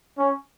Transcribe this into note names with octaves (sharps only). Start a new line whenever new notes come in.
C#4